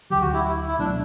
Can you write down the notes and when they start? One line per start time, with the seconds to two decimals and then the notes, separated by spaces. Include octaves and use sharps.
0.10 D2 D3 F#3 G4
0.21 F#4
0.34 E4
0.44 E4
0.68 E4
0.79 C#2 B2 F#3 A3 D4